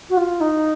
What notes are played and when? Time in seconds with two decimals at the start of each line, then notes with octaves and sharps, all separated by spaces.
0.09 F#4
0.17 F4
0.40 D#4